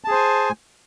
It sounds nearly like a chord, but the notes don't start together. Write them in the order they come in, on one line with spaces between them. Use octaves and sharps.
A5 G#4 C5 G#5